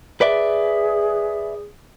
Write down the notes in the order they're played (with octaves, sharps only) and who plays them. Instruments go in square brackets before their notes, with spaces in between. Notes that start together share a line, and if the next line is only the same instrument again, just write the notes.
[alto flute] G#4 [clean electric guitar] B4 D5 E5